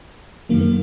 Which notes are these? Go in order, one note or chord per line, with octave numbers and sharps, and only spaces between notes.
F#2 D#3 F#3 A#3
A#3